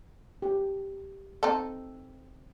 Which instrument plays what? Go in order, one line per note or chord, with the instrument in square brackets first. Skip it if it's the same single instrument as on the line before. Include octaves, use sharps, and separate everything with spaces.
[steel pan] G4
[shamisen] C4 D#4 A4